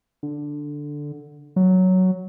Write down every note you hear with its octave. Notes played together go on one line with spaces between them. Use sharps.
D3
F#3